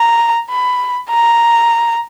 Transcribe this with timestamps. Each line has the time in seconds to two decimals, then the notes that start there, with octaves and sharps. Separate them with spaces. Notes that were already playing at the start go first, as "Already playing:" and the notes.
Already playing: A#5
0.50 B5
1.10 A#5